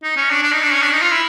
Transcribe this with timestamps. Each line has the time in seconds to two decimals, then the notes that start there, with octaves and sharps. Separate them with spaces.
0.03 D#4
0.17 C#4
0.31 D4
0.43 D4
0.52 D#4
0.63 D4
0.73 C#4
0.83 D4
0.92 D#4
1.02 F4
1.12 E4